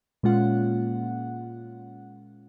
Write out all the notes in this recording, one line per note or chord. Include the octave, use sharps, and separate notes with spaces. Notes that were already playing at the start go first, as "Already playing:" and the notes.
A#2 G#3 A#3 C#4 F4 F#5